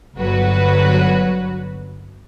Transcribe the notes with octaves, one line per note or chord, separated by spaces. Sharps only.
G1 F#3 F#4 B4